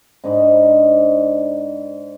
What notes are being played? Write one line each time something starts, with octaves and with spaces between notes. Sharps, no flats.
G#2 D4 D#5 B5